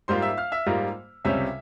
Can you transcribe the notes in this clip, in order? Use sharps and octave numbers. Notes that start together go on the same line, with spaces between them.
G#2 G3 A#3 F4 C5 C6
E5 E6
F5 F6
E5 E6
G#2 G3 A#3 F4
C#2 C3 G3 C#4 E5 E6